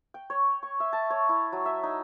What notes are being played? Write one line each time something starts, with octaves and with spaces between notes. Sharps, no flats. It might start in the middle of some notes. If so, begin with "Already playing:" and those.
G5
C#5
C#6
E5
A5
C#5
E4
F#3
E5
D#4